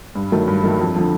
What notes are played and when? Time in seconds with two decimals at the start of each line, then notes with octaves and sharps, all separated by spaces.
0.15 G2
0.32 D#3 F#3 A3
0.47 G2
0.64 D#3 F#3 A3
0.80 F2
0.96 D3 F3